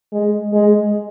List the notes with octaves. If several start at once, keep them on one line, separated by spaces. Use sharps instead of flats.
G#3
G#3